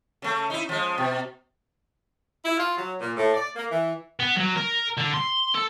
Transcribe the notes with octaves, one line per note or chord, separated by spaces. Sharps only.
C#3 A3
D#4 E4
F3 G#3
B2
E4
F4
F#3
A#2
A2
D5
A#3
E3
B3
F#3
A#4
D3
C6
A4